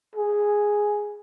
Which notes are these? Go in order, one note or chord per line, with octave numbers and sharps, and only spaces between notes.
G#4